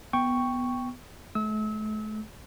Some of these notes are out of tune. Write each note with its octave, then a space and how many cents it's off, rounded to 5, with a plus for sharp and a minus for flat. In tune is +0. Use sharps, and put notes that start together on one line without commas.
B3 +0 G5 +5 C#6 +0
A3 -40 E6 -35